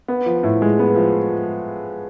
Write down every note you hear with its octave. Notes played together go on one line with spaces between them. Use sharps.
B3
F3
A2
G#3
B3
F3